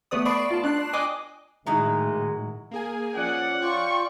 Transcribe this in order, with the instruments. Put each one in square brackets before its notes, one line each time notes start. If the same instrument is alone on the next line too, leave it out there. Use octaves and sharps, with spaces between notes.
[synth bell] A3 B3 B4 D5 D#6
D5 A5 B5 C#6 C7 D7
F4 A5
D4 D5 F#6 C7
D#5 G5 G#5 D6 D#6 F#6
[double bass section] A2 D#3 [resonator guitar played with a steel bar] F#3 D#4 E4 [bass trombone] G#3
[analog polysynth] A#3 G#4 G#5
[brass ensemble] F3 C#4 F#5 [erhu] D5
[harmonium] F4 D5 [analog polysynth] G5 [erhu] C#6